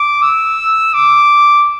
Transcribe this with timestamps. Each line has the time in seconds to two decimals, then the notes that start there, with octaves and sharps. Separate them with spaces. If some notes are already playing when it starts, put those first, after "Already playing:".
Already playing: D6
0.22 E6
0.94 D6